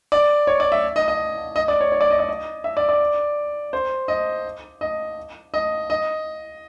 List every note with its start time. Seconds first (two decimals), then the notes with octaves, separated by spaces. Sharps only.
0.12 D5
0.47 C#5
0.60 D5
0.72 E5
0.96 D#5
1.08 D#5
1.56 D#5
1.68 D5
1.81 C#5
1.92 C#5
2.01 D5
2.10 D#5
2.19 D5
2.29 D#5
2.64 E5
2.77 D5
2.89 D5
3.73 C5
4.08 D#5
4.81 D#5
5.54 D#5
5.90 D#5